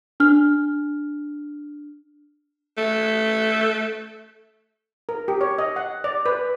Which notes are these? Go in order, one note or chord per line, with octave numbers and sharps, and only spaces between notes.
D4 F6
A3
A#4
G4
C#5
D#5
F#5
D5
B4